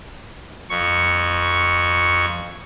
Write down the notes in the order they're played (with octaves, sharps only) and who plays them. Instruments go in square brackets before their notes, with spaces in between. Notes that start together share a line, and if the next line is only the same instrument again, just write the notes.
[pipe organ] F2 C#6